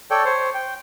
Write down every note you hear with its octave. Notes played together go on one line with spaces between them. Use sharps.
A4 C#5 D5 G5
C5 C#5
G5